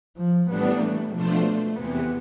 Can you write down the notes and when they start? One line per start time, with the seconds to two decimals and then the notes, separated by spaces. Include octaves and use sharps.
0.16 F3
0.48 A2 E3 G3 B3 D4
0.80 A3
1.12 B2 F3 A3 D4 F4 C5
1.44 A3
1.76 E2 C3 E3 B3